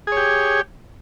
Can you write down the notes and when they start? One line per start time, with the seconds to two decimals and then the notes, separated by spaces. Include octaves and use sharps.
0.07 G#4
0.12 C#5
0.17 G4